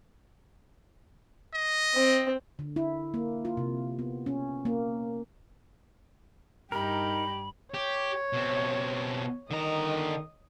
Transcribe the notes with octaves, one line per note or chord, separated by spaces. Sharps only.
D#5
C4
D3
E4
A#3
F4
C3
B3
C#4
A#3
G2 D#4 G4 A#4 B5
G4 C#5
B2 C4
D3 D#3 D#5 A#5